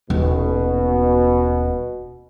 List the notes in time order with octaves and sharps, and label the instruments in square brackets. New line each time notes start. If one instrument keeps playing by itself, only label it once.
[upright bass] D#1 [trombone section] B2